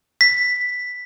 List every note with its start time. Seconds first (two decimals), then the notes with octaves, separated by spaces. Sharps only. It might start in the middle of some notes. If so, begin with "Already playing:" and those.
0.21 B6